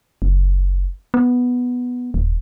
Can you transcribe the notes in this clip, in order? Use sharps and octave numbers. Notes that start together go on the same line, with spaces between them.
F#1
B3
D#1